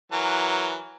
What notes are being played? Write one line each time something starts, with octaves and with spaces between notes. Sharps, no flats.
E3 F#3 A#4